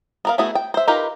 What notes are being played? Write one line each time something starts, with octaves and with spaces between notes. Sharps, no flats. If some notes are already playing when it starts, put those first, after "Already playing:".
B3 A#4 F5
A3 B3 E4 F#4 G#4
G5
C5 E5
D#4 F4 G4 A#4 B4